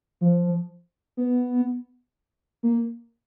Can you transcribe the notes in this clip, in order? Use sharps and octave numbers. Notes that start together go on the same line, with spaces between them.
F3
B3
A#3